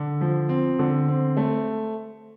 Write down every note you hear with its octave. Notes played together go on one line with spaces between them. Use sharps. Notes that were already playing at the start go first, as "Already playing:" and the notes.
Already playing: D3
F3
C4
D3
C4
A3